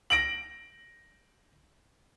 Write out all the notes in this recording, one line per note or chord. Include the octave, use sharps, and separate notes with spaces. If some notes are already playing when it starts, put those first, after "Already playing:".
A#6 D7 F#7